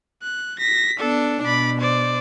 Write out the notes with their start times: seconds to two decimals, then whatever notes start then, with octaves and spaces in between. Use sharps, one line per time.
0.23 F#6
0.59 A#6 B6
0.99 B3 D4 A4
1.44 B2 D5 B5
1.81 C5 D5